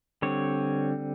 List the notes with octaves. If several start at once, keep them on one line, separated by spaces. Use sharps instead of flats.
D3 G3 C4 C#5